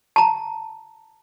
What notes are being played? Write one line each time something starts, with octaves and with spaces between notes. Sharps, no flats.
A5 A#5